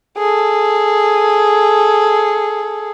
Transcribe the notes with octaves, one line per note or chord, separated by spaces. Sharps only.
G#4 A4